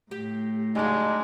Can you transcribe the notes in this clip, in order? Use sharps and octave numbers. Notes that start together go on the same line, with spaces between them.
A2 G4
C#3 F#3 G#3 D4 D#4 F5